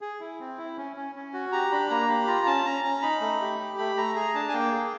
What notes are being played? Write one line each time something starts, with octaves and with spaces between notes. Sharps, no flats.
G#4
E4
C4
E4
C#4
C#4
C#4
F#4
G4 A#5
D4 B5
A#3 A#5
G4 B5
F4 A#5
C#4 A5
C#4 A#5
C#4 A#5
D#4 B5
A3
G4
G4
A3 B5
A3 A#5
G#4 A#5
D4 A5
G#5
A#3 G5
G#4